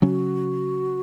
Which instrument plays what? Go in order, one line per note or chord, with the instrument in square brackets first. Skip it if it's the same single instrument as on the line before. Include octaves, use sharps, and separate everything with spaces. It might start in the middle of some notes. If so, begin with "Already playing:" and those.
[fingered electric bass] C#3 F#3 C#4 [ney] F#4